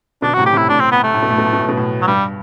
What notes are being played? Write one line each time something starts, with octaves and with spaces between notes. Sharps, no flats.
B2 D3 D4
F#4
A2 C3
G4
A2 C3
E4
A2 D4
C4
B3
A3
A2
B2
A2
B2
A2
B2
A2
B2
A2
F#3
G2 G3